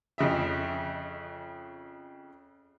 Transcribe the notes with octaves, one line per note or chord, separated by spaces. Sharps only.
F2 C#3 D#5 E5